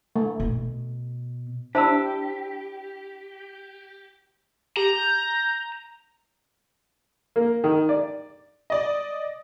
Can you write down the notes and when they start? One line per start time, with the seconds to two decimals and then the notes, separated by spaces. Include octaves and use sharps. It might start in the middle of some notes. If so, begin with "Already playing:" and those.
0.16 A3
0.40 B2
1.75 D4 E4 G4 C5 A5 A#5 E6
4.77 G4 A#5
4.93 G6
7.36 A#3
7.64 D#3
7.89 D5
8.70 D5 D#5